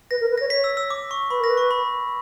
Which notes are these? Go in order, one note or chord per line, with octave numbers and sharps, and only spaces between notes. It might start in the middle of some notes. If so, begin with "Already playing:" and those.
B4 A#6
A#4
B4
C#5 A#6
C#5 B6
E6
E6
D6
C#6
B4 B5
A#4 A#6
B4
C#6
B5